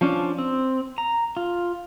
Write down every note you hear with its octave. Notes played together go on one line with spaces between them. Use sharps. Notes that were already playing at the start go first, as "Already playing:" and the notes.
F3 C#4 D4
C4
A#5
F4